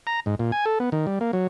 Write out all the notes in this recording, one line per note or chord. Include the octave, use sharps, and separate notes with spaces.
A#5
G#2
A#2
G#5
A4
B3
D#3
G3
A#3
F#3